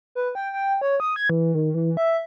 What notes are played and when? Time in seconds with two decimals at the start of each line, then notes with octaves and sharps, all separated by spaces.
0.15 B4
0.35 G5
0.53 G5
0.81 C#5
1.00 D#6
1.16 G#6
1.30 E3
1.55 D#3
1.74 E3
1.97 E5